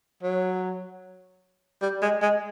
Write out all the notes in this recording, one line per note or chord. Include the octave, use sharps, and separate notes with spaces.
F#3
G3
G#3
G#3